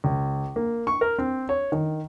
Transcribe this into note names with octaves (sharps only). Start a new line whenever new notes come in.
C#2
A#3
C#6
A#4
C4
C#5
D#3